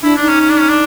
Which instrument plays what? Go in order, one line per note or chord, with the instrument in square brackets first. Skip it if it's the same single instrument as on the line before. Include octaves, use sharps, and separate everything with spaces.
[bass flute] D4 [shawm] E4
[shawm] D4
[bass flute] D#4
[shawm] C#4
C#4
D4
C#4
D4